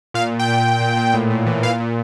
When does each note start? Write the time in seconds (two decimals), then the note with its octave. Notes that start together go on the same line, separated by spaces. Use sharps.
0.14 A#2 F5
0.32 A#2
0.39 G5
0.48 A#2
0.64 A#2
0.80 A#2
0.97 A#2
1.14 A2
1.30 A2
1.46 E3
1.63 A#2 F5
1.80 A#2